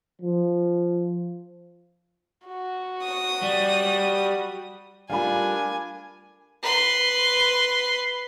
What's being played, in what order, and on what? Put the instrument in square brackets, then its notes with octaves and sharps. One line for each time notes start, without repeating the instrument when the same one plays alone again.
[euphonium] F3
[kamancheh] F#4
[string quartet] D#6
[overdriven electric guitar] G3
[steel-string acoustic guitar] G3 A3 F4 [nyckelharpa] D4 A#4 [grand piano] F5 B5 [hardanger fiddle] G#5
[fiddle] B4 C6